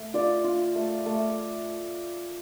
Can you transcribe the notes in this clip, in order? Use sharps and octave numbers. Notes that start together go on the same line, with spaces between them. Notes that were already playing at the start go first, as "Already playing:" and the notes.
Already playing: A3
F4 D5
F4
A3
A3